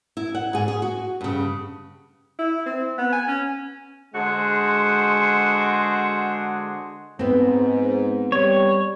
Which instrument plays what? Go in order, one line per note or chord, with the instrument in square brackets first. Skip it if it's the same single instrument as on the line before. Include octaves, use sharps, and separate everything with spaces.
[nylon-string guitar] E4
F#5
G#2 G#4
G#4
F#4
G2 C#3
[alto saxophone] E4
C4
B3
G#5
C#4
[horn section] D3 G#3 F#4 G#4 C5
[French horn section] G#2 [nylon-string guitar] B3 C4
[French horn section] G3 [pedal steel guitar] C#5